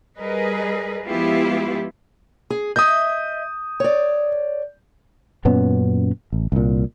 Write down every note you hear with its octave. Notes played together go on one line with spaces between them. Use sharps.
G3 G#4 A#4 B4 D#5
F3 G#3 B3 E4 F4 G4
G#4
D#5 E5 D#6 G6
C#5 D5
F#2 A#2 B3 C#4
A1
C2 A#2